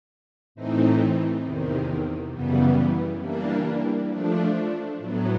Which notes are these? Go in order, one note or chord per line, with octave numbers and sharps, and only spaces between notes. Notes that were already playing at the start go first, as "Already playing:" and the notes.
A2 E3 A3 C4 D#4
E2 C3 D#3
F#2 C#3 E3 G3 B3
E3 G3 A#3 D4
F3 A3 D4
A2 F#3 B3